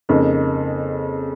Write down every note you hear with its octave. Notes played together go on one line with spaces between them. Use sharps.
F2 C#3 A#3 D#4